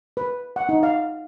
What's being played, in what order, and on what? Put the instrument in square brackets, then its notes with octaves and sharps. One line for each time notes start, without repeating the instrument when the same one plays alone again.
[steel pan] B4
F#5
D#4
F5